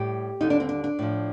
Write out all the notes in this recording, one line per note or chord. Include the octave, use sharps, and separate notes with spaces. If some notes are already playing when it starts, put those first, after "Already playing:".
Already playing: A2 G3 G4
D#2 D3 G3 D#4
D4
C4
D4
D4
A2 F3